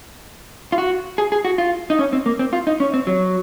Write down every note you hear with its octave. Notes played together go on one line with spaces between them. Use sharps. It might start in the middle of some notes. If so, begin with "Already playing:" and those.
F4
F#4
G#4
G#4
F#4
F4
D#4
C#4
C4
A#3
C4
F4
D#4
C#4
C4
F#3